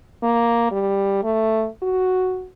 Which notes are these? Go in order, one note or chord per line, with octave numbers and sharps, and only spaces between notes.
A#3
G3
A3
F#4